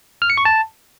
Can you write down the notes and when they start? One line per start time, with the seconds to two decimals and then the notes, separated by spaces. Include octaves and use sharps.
0.22 F6
0.30 C#7
0.38 C#6
0.45 A5